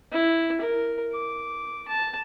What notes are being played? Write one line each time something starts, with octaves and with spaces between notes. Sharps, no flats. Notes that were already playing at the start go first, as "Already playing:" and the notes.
E4
A#4
D6
A5